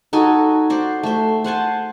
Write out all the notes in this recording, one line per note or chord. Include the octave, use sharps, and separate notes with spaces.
D#4 F#4 A4 G#5
F#4 C5 D5
A3 C5
C5 F#5 G#5 A5